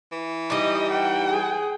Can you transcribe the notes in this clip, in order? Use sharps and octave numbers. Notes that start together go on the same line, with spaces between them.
E3
G3 D#4 D#5
F#5 G5
G#4